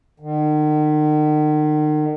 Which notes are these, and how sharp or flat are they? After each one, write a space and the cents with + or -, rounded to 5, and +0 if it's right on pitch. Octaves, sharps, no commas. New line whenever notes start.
D#3 -40